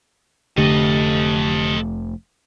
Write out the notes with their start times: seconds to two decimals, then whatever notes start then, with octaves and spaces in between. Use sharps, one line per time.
0.58 F1 D3 A3 G4 A4 D#5